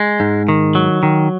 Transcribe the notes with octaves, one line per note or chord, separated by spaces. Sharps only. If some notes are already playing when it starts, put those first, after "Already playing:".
Already playing: G#3
G#2
D#3
F#3
D#3